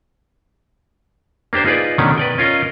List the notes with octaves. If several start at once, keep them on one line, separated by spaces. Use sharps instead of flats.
A#3 D4 G4 C5
D#4 F4 G#4 B4 D5
B2 D#3 A3 C#4 D4
B4 D5 G5
C#4 F4 A#4 D#5